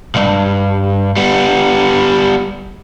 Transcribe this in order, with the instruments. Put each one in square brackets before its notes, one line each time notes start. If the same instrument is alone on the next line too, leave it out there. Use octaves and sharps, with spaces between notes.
[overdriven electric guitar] B1 G2
G3 B3